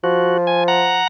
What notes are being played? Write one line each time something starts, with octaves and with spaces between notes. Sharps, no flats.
F3 F#4
G#5
F#5 A#5